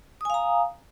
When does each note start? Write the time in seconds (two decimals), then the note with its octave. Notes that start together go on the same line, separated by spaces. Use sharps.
0.21 D#6
0.25 G#5
0.30 F5
0.34 A#5